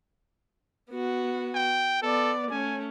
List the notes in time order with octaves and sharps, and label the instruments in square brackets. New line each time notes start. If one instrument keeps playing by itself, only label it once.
[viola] B3 F#4
[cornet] G5
[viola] B3 D5 [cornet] A4
[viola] A3 C#4 [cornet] G#5